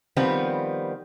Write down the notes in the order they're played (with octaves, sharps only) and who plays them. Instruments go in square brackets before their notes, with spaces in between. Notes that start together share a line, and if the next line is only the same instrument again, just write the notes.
[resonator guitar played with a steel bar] D#3 F3 G3 B3 C4